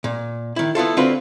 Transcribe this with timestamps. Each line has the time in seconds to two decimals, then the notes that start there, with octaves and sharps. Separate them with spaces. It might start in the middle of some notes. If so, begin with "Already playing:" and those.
0.04 A#2
0.56 D#3 E4
0.75 B3 E4 F4 A4
0.97 D3 C4 D4 F4 F#4 B4